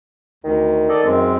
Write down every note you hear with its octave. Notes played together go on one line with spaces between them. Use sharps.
D2 D#3
A4 D5 D#5
F#2 G#3 C4